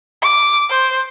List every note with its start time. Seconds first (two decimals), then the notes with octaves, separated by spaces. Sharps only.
0.22 D6
0.70 C5